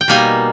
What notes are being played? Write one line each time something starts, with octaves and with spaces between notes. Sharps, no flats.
G5
B2 G3 A#3 D#4 G#5